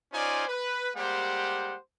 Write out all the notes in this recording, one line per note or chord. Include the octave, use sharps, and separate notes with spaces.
C#4 D#4 F4 C5 D5 G#5
B4
G3 G#3 A#3 G4 C5 F#5